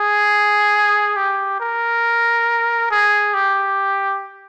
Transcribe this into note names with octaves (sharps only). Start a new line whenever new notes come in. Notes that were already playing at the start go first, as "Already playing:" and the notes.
Already playing: G#4
G4
A#4
G#4
G4